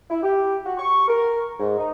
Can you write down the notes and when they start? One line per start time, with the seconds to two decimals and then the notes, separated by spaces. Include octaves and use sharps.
0.10 E4
0.23 G4
0.66 F#4
0.78 C#6
1.08 A#4
1.60 G#2
1.78 D#4